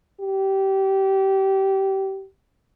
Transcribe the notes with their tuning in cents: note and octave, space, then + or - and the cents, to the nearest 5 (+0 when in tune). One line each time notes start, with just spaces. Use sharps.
G4 -20